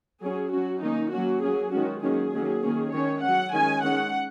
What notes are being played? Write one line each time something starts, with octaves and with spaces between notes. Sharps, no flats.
F#3 C#4 G#4
F#3 C#4 F#4
D#3 A#3 C#4 D#4
F#3 A#3 C#4 F#4
F#3 A#3 C#4 G#4
D#3 G#3 C#4 F#4
D#3 F#3 A#3 C#4 G#4
D#3 F#3 A#3 C#4
D#3 A#3 C#4
D#3 G#3 C#4 C#5
F#3 C#4 F#5
D#3 G#3 C#4 G#5
D#3 G#3 C#4 F#5